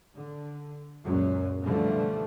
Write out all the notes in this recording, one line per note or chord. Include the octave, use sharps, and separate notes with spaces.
D3
C#2 F#2 A#2 F#3
B2 D3 E3 F3 G3 A3